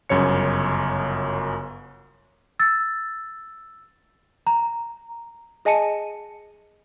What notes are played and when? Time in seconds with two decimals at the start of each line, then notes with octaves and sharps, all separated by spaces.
0.09 G1 F#2 C#3 C#5 C#7
2.60 E6 A6
4.47 A#5
5.65 G#4 D#5 G#5 A5 C#7 D#7